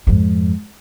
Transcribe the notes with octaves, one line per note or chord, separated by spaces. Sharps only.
F2 G#2